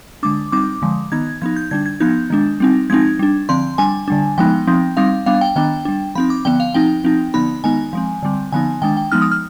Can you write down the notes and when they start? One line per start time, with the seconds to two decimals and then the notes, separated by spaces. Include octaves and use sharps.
0.23 D3 G#3 D4 D6
0.52 G3 C4 D#4 D6
0.82 D3 F3 G#3
1.12 D#3 B3 D#4 G#6
1.42 F3 B3 D#4 G#6
1.56 G6
1.71 D3 G3 D4 G#6
1.86 G#6
2.00 F3 B3 D#4 G6
2.30 D#3 G#3 D4
2.60 G3 C4 D#4
2.90 F3 G#3 C4 D#4 G#6
3.19 G3 D4
3.49 D3 F3 C4 C6
3.78 G3 D4 G#5
4.08 D3 G3 D4
4.38 F3 G#3 B3 D#4 G5
4.67 F3 C4 D#4
4.97 G3 C4 D#4 F5
5.26 G3 B3 D4 F5
5.41 G5
5.56 D#3 B3 D4 G5
5.85 G3 D4
6.15 F3 C4 D#4 B5
6.30 D6
6.45 D3 F3 B3 G5
6.60 F5
6.74 F3 C4 D#4 G5
7.04 F3 C4 D#4
7.34 D3 F3 B3 D#4 B5
7.64 D#3 G#3 B3 D#4 G#5
7.93 F3 G#3 C4
8.23 D3 G3 C4
8.52 D3 F3 B3 D#4 G#5
8.82 D#3 G#3 D4 G5
8.97 G5
9.12 F3 G#3 B3 D#4 F6
9.22 D#6
9.32 F6